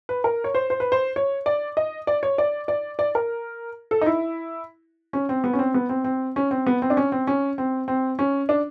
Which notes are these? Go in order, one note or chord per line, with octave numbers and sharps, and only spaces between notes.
B4
A#4
C#5
C5
C5
B4
C5
C#5
D5
D#5
D5
C#5
D5
D5
D5
A#4
A4
D#4
E4
C#4
C4
B3
C#4
C4
B3
C4
C4
C#4
C4
B3
C4
D4
C#4
C4
C#4
C4
C4
C#4
D4